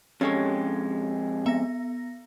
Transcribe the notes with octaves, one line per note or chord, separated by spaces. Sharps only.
F2 G#3 C#4 G4 A4 C#5
B3 E5 A#6